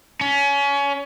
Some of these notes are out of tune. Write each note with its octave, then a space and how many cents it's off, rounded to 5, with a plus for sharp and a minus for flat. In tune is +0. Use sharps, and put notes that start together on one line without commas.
C#4 +25